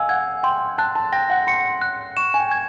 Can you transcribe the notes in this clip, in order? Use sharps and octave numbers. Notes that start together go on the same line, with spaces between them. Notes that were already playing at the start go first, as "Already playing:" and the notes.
Already playing: D#5 F5 G#5 E6
F#5 G#6
G5 C6
A5 F#6
A5
G5 A#6
F#5
C6 C#7
F#6
C#6 E7
G#5
G5
G#6